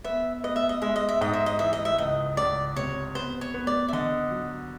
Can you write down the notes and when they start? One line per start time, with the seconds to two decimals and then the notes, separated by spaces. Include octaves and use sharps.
0.04 B3 E5
0.44 B3 D#5
0.56 E5
0.69 D#5
0.82 G#3 E5
0.96 D#5
1.09 E5
1.21 G#2 D#5
1.33 E5
1.46 D#5
1.59 E3 E5
1.73 D#5
1.85 E5
1.98 C#2 D#5
2.37 C#2 D5
2.76 C3 C#5
3.15 B3 C5
3.41 C#5
3.54 B3
3.67 D5
3.88 E5
3.93 D3 D#5
4.31 F#3